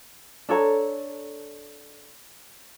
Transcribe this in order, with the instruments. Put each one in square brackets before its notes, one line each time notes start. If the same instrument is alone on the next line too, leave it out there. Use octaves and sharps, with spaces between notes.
[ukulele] D4 A4 C#5 A#5